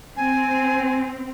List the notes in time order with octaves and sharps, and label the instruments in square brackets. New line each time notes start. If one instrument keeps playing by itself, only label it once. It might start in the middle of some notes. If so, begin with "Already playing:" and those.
[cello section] C4 [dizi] G#5